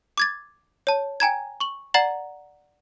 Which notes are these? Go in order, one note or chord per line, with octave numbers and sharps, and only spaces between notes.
D6 G#6 A6
C#5 A5
G5 G#5 A#5 G#6
C#6 F#7
D5 F#5 A#5 A6 F#7